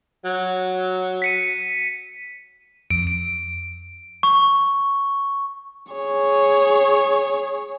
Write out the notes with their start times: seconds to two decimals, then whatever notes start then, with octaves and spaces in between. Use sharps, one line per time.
0.25 F#3
1.22 B6 C#7 D#7
2.90 F2 D7
3.07 D7
4.23 C#6
5.93 G#4 C#5